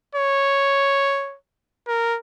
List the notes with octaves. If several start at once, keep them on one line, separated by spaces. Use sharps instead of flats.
C#5
A#4